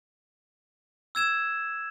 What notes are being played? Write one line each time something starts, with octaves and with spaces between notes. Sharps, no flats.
E6 G#6 E7